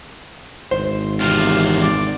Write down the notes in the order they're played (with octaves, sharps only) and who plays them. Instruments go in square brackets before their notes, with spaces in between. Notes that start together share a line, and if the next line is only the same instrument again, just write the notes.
[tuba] G#1 [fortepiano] C5
[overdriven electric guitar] E2 C3 [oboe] F4
[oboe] D5